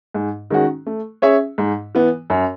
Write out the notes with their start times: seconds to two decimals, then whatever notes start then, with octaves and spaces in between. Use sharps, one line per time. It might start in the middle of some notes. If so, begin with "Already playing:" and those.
0.14 G#2
0.50 D#3 G#3 C#4 F#4
0.86 A3
1.22 C#4 G#4 C#5 E5
1.58 G#2
1.95 E3 B3
2.30 F#2